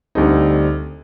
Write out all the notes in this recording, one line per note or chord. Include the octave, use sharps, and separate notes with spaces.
D2 D3 G3 C4 D#4